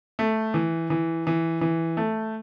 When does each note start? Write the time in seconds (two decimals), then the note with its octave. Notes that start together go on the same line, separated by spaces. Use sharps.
0.19 A3
0.54 E3
0.90 E3
1.27 E3
1.61 E3
1.97 A3